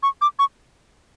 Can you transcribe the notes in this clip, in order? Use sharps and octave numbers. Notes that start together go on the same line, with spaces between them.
C#6
D6
C#6